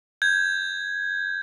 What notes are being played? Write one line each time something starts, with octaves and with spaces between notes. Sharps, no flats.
G6 G#6